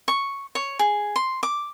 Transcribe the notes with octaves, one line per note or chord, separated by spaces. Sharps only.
C#6
C#5
G#4
C6
D6